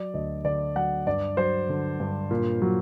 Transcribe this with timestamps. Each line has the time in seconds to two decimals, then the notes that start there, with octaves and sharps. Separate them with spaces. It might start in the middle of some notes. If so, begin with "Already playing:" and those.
Already playing: F#3 D5
0.14 D2 D#5
0.45 D3 D5
0.76 F#3 F#5
1.07 G2 D5
1.37 F#3 C5
1.69 D3
2.00 G2
2.31 A#2
2.62 F#3